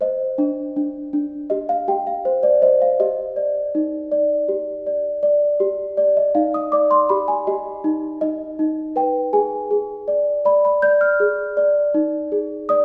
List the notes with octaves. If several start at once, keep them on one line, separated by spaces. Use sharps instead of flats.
C5 D#5
D4
D4
D4
G4 D#5
F5
G4 G5
F5
C5
D5
C5 D#5
F5
G4 D#5
D5
D#4
D5
G4
D5
D5
G4
D5
D#5
D#4 F5
D#6
D5 D6
C6
G4 B5
G#5
G4 D#5
D#4
D#4 D#5
D#4
B4 G5
G#4 G#5
G#4
D5
D5 B5
B5
D5 G6
F6
G#4
D5
D#4
G#4
D5 D#6